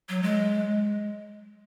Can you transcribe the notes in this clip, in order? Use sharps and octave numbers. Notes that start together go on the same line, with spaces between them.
F#3
G#3